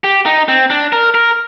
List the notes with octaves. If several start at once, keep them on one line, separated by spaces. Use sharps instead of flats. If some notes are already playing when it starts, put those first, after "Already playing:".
G4
D#4
C4
D4
A#4
A#4